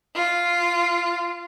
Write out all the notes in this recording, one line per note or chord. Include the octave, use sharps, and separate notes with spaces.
F4